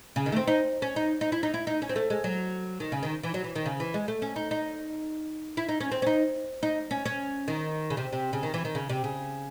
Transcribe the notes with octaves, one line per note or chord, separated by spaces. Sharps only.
C#3
D#3
A3
C4
D#4
C#4
D#4
D#4
E4
D#4
E4
D#4
C#4
C4
A3
G#3
F#3
D#3
C#3
D#3
E3
F#3
E3
D#3
C#3
E3
G#3
A3
C#4
D#4
D#4
E4
D#4
C#4
C4
C#4
D#4
D#4
C#4
C#4
D#3
C#3
C3
C3
C#3
D#3
E3
D#3
C#3
C3
C#3